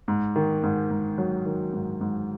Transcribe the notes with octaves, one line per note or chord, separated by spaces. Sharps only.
G#2
D#3
G#2
G#2
F#3
D#3
G#2
G#2